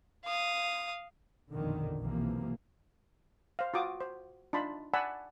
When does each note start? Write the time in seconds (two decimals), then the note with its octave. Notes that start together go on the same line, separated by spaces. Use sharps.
0.25 F5 D#6
1.53 A#1 F2 B2 D3 D#3
1.99 B1 C3 E3 F3 A#3
3.59 C5 F5
3.74 F4 F#4 D6 D#6
4.01 C5
4.53 D4 D#4 F4 A5 B5 C6
4.94 D5 F#5 G#5 A5 B5 E6